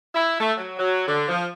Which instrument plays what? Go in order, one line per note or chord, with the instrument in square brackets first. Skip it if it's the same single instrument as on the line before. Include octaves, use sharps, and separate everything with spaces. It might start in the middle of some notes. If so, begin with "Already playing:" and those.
[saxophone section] E4
A3
F#3
F#3
D3
F3